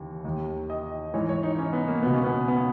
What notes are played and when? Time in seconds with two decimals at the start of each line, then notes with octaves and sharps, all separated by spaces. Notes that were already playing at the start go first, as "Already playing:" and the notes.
Already playing: D#2 C#3 E3
0.24 D#2 D#3
0.70 D#5
1.14 G#2 E3 C#5
1.29 C#5
1.43 D#4
1.58 C#4
1.73 B3
1.88 A#3
2.03 C#2 B2 B3
2.14 C#4
2.24 B3
2.48 B3